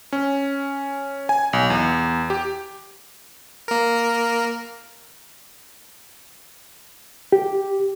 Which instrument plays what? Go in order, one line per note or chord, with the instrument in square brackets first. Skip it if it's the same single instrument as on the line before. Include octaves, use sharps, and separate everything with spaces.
[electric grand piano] C#4
G#5
B1
E2
G4
[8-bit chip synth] A#3 A#4
[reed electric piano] G4